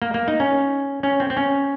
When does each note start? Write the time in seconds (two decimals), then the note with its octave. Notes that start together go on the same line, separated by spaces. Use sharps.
0.02 A#3
0.14 A#3
0.28 D#4
0.40 C#4
1.03 C#4
1.20 C4
1.30 C4
1.37 C#4